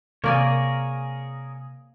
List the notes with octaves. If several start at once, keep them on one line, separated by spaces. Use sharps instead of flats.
C3 A#3 G#4 A#4 C#5 D5 G#5